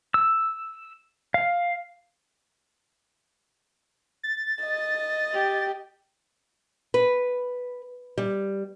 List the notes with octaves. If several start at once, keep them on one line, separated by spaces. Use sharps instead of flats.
E6
F5
A6
D#5
G4
B4
G3